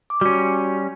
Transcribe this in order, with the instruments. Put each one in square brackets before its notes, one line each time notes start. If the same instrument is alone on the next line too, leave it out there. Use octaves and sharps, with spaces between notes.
[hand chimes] D6
[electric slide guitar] G3 C#4 [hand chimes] F#4